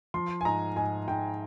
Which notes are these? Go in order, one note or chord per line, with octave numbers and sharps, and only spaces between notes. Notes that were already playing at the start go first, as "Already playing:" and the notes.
F3 C6
G#5
G#2 A#5
G#2 G#5
G#2 G5